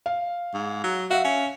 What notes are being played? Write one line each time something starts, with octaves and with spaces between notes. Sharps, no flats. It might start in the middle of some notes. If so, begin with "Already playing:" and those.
F5
G#2
F#3
F#4 E5 F5
C#4